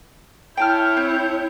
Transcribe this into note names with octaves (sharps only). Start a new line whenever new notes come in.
E4 C#5 G5 A5 F6 G6
C4